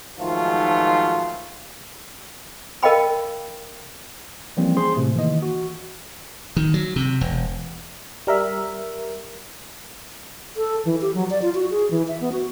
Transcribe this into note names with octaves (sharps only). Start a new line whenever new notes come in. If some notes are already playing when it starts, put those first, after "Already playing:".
G#2 D#3 F3 F#3 A3 F4
A#4 D#5 F5 G5 B5
E3 F3 G3 A#3 C4 C#4
G#4 C5 C6
A2 C3 A3
D#3 E3 A#3 D#5
F#4
D#3
F#3
C3
E1
G3 A#4 E5
A4
E3
G4
F#3
D5
F4
F#4
G#4
E3
E5
B3
F#4